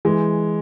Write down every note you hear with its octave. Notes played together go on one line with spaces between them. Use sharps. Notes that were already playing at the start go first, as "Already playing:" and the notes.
E3 G#3